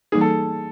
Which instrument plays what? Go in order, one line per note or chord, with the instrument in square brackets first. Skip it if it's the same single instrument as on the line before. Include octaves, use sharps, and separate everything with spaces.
[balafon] E3 G3 A#3 D#4 [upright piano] G#4
[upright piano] A4